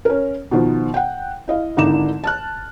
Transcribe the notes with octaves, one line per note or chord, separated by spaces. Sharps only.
C#4 A#4
B2 D#3 F3
F#5 G5
E4 D#5 F5
G#1 D3 D#4 E4 D6 E7
A5 F6 F#6